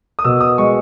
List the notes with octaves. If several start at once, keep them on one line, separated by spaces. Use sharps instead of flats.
D#6
B2 E6
D#6
G#3 C#6